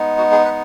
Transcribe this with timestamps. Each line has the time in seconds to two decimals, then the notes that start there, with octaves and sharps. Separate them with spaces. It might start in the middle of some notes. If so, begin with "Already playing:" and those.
Already playing: G#3 B3 D#4
0.18 F#4
0.32 G#4
0.45 B4